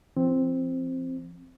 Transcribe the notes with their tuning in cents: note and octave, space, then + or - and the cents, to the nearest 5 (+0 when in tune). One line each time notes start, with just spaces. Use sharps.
F3 -40 C4 +0